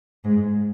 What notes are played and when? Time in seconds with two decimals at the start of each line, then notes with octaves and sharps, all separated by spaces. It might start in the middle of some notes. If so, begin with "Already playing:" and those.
0.24 G#2